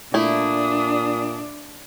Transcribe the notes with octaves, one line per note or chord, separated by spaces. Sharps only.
A#2 A3 D4 E4 D#6